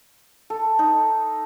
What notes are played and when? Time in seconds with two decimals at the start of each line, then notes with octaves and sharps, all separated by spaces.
0.50 A4
0.79 D#4